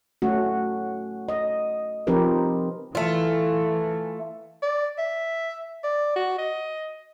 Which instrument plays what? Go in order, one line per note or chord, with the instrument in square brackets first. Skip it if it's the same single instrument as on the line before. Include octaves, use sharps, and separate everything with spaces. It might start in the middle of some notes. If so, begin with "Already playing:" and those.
[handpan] A3 C#4 F#4
D#5
F3 C4 D#4 G4 A#4 B4
[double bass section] E3 [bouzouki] A3 F4
[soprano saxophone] D5
E5
D5
F#4
D#5